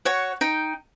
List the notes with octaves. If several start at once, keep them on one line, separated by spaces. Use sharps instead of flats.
F#4 C#5 F#5
D#4 G5